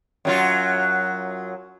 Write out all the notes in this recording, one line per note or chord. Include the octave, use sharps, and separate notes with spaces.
F#2 F#3 F4